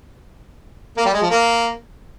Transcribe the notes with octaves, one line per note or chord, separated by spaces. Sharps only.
A#3
G3
G#3
F3
A#3